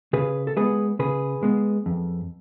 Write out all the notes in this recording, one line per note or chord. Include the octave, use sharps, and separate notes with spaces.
C#3 G#4 B4
A4
G#3 B3 G#4 B4
C#3 G#4 B4
G#3 B3
F2